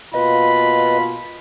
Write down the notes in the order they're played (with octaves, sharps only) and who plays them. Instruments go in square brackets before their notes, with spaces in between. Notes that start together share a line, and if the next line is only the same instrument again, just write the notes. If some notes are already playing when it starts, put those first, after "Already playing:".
[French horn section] B2 A#3 F4 [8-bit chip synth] B4 D#5 [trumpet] B5